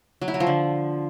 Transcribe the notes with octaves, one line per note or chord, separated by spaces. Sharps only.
F#3
E4
F#3
F3
D3